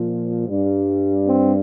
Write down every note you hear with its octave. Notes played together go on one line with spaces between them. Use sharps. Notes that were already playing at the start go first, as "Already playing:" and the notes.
Already playing: A#2 F3
G2 G3
C4